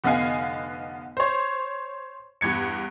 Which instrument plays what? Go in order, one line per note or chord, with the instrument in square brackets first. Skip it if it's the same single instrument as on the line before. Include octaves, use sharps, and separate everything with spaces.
[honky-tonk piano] F1 D3 B3 D#5 F5 G#5
C5 C#5
E2 G2 G#6 C#7